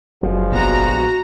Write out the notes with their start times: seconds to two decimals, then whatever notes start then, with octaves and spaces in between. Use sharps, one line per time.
0.23 F#1 G2 F3 F#3 G#3
0.52 A#1 B3 F#4 A#5